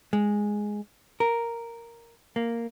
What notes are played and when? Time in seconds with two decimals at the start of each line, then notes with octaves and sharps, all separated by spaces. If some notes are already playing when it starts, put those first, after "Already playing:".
0.13 G#3
1.20 A#4
2.36 A#3